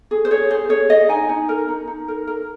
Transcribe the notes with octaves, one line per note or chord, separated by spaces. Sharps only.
G#4
C5
G#4 C#5
G#4 C5
G#4 C#5
G#4 D#5
D#4 G#5
D#4
A#4
D#4
D#4
A#4
A#4